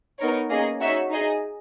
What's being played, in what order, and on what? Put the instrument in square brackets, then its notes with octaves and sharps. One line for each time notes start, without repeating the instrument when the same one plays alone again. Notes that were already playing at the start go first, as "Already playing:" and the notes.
[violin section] B3 D#4 A#4 C#5
A#3 C#4 G#4 D#5
D#4 F#4 C#5 E5
D#4 G#4 D#5